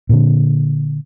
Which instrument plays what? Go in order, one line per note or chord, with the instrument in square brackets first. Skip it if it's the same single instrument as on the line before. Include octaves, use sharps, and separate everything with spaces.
[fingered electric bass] A#2 D3